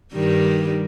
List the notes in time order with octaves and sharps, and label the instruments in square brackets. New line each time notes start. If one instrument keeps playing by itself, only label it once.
[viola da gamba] G2 D#3 G3